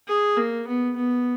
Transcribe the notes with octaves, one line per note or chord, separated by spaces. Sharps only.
G#4
A#3
B3
B3